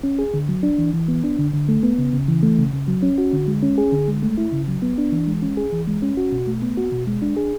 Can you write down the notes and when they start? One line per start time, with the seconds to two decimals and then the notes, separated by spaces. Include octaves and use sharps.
0.03 C#4
0.19 G#4
0.34 D3
0.49 F#3
0.63 D4
0.78 E3
0.94 E3
1.08 B3
1.24 D4
1.38 D3
1.54 D3
1.69 A3
1.83 B3
1.98 C#3
2.13 C#3
2.28 E3
2.43 A3
2.58 C#3
2.73 C#3
2.88 F#3
3.03 C#4
3.18 F#4
3.33 D3
3.48 G#3
3.63 C#4
3.78 G#4
3.92 D3
4.08 G#3
4.22 A3
4.38 E4
4.52 C#3
4.68 F#3
4.82 B3
4.98 D4
5.12 E3
5.27 G#3
5.42 C#4
5.57 G#4
5.72 E3
5.87 G#3
6.02 C#4
6.17 F#4
6.32 B2
6.47 A3
6.62 B3
6.77 F#4
6.92 B2
7.07 G#3
7.22 D4
7.36 G#4